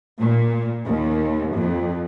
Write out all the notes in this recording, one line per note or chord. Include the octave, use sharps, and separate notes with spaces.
A#2
D#2
F2